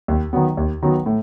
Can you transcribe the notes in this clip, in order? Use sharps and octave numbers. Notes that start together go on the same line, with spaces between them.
D#2
D#3 F#3 B3
D#2
D#3 F#3 B3
A2